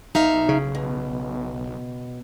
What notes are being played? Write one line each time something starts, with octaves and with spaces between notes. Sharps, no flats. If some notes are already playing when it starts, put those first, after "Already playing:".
B1 D#4 E5 F5
C#3
B2